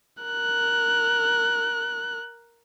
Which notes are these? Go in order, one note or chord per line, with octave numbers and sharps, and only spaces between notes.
A#4 F#6